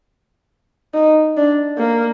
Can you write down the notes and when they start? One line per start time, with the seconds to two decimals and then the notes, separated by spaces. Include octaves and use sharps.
0.94 D#4
1.37 D4
1.78 A#3